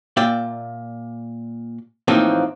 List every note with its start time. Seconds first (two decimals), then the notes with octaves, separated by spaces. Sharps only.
0.17 A#2 D5 E5 G5
2.08 A2 E3 F3 A#3 C4 D#4